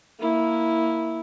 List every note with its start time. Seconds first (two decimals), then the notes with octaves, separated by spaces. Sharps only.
0.19 A#3 E4